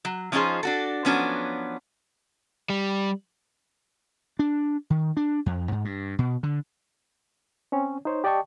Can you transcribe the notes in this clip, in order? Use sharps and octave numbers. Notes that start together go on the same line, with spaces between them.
F#3
F3 C#4 D#4 F4 G#4 C5
D4 F#4 A4
F3 F#3 B3 C#4 D4 F#4
G3
D4
D#3
D4
F2
G#2
G2
B2
D3
C4 C#4 C#5
D#4 C5 C#5
G4 D5 D#5 G5 A5 C#6